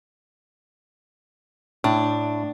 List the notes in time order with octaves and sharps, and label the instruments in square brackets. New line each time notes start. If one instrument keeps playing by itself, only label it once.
[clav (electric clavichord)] A2 [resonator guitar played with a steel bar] D4